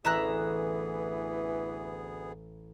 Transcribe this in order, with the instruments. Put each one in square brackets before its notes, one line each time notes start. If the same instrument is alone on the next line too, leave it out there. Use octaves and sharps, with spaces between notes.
[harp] A1 [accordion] D2 B3 G#4 [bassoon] E3 [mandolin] E5 A#5 F#6